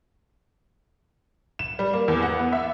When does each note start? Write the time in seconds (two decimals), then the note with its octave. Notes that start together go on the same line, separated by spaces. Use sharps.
1.59 E7
1.79 G3
1.93 A#3
2.08 E2
2.22 F#5
2.39 B3
2.53 E5